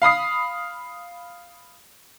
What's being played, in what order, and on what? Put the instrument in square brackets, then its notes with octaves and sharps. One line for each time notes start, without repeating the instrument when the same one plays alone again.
[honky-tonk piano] F5 B5 D#6 C7